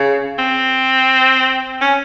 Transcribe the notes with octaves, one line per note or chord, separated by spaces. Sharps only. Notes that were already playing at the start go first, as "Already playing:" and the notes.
Already playing: C#3
C4
C#4